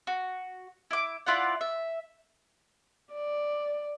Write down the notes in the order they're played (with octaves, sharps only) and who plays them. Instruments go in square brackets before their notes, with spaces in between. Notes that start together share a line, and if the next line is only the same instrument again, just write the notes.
[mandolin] F#4
E4 D6
E4 F4 D5 F#5
E5
[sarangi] D5